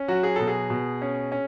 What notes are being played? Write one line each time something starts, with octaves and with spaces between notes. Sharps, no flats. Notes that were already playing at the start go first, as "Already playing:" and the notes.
Already playing: C#4
F#3 F#4
G#4
B2 A4
G#4
B2
C#4
C#4